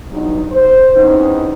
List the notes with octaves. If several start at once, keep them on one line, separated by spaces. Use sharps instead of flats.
E2 G2 F#3 D#4
C5
E2 C4 C#4 D#4